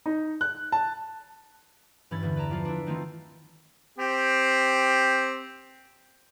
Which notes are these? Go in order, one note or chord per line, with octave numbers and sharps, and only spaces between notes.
D#4
F#6
A5
G2 E3 C#4 B5 G#6 A6
E2 D3
B4 D5 A5 A#5
F3 F4 D5
D4 E4
D#3 E3 A3 C4 D#4 F4
C4 G4